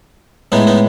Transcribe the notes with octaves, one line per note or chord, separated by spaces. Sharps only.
A2 G#3 B3 D#4
B3 D#4